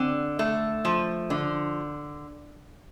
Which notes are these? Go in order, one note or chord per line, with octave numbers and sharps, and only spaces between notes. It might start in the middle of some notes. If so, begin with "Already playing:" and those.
Already playing: D3 C4
A3
F3
D3